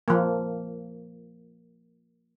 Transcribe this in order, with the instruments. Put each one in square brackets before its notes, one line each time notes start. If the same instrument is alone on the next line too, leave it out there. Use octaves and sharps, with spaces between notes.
[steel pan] F3 A#3